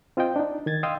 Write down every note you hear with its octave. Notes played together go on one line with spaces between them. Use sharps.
C4 F4 C5 D#5 G5
D4 D#4
D#3 G#6 A6
D#5 F5 G5 C6 D#6 E6